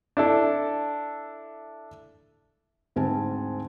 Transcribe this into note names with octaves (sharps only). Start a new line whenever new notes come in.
D4 E4 A4
D2 G#2 C4 G#5 A5